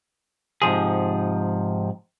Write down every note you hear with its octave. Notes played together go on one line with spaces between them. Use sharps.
G#2 C3 F3 G#4